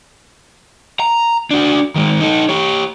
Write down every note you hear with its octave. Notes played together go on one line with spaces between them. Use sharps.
A#5
D4 F#4
D#3 G#3
D#4 A4
G4 C#5